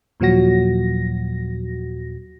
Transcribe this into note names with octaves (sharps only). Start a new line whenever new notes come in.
D#2 A#2 F3 F#3 F#4 A#6